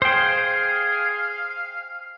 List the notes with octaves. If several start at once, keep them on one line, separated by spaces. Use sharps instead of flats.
G#4 C5 F5 G5